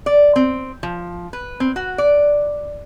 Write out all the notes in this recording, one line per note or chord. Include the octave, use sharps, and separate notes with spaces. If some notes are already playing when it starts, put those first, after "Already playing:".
D5
C4
F3
B4
C4
F#4
D5